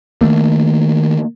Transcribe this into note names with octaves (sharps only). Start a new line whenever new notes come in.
D#3 E3 A3 A#3